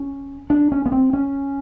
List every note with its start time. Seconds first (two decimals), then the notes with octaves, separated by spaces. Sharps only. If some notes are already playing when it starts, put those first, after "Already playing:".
Already playing: C#4
0.50 D4
0.72 C#4
0.86 B3
0.92 C4
1.13 C#4